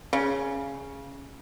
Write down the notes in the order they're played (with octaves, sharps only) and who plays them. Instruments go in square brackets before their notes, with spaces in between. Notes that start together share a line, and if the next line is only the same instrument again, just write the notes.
[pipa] C#3